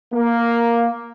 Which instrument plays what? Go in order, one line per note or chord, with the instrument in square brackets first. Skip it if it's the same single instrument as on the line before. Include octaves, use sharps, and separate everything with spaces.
[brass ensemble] A#3